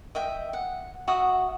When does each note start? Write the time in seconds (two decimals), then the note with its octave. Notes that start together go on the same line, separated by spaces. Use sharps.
0.15 D#5 E5 G5
0.53 F#5
1.08 F#4 E5 F#5 D#6